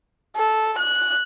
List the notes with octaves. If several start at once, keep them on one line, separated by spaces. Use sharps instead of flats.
A4
F#6